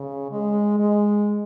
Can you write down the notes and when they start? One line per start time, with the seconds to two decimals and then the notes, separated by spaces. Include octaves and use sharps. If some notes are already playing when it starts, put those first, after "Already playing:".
Already playing: C#3
0.31 G#3
0.79 G#3